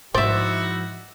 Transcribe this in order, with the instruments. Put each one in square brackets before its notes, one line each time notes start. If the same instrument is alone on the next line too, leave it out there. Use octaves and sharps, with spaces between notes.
[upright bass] G#2 F3 [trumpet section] D#4 E4 F#4 [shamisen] C5 [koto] D5 E5